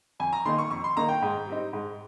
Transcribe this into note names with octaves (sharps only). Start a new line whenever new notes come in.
F2 G#5
A#5
D#3 A#3 D#4 C6
C#6
F2 C#6
C6
D#3 A#3 D#4 A#5
G5
G#2
G3 C4 D#4
G#2